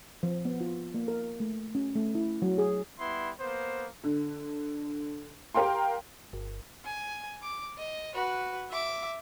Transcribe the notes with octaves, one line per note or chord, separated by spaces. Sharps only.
F3
B3
F4
A#3
A#4
A3
C#4
A3
E4
F#3
G#4
G3 B3 E4 C6
A#3 B3 C5
D3
G4 A#4 F5 G5 C6
G1
G#5
D6
D#5
F#4 B4
E5 D6